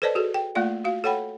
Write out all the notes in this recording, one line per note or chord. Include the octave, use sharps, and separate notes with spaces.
A4 B4 C5 D5 D#5 A5
F#4 G#4 A4
G5
A3 A#3 F4 D5 F5
F#4 F5
A4 C#5 F#5 G5 B5